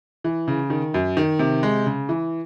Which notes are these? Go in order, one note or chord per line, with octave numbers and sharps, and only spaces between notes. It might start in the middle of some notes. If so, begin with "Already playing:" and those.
E3
C#3
D#3
F#2
D#3
C3
G#3
C#3
E3